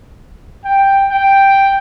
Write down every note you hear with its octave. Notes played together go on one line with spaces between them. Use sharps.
G5
G5